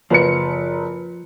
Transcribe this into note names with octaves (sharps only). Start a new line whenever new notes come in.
F#1 F3 B4 C#7